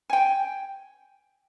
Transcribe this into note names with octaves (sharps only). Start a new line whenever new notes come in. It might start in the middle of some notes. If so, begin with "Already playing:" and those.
G5 G#5